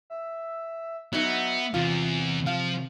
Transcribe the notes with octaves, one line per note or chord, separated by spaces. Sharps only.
E5
F#3 B3 D#4 E5
E2 C3 F4
F3 F5